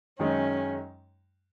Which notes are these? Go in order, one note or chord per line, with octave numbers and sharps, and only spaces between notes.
F#2 D#3 G#3 C#4 D#4